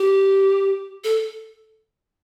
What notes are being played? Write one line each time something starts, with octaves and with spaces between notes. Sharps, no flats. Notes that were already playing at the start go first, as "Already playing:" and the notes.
Already playing: G4
A4